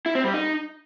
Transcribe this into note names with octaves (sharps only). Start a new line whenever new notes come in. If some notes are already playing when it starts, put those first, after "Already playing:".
E4
C4
G3
D#4